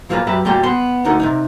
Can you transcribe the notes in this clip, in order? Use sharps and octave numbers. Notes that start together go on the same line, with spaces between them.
A#2 F3 A#3 F4 B4 A#5
F#2 G4 B4 E5 A#5
E2 A#2 G3 F#4 G5 A#5
B3 C6
D2 D3 D#4 A#4 F#5
C3 D#3 D#4